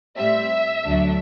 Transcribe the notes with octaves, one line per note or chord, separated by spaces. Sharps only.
A2 G3 C4 E5
D2 D3 F#3 A3 D4